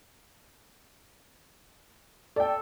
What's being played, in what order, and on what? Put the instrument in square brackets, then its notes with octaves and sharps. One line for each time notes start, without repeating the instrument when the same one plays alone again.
[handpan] A4 [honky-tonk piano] D5 G5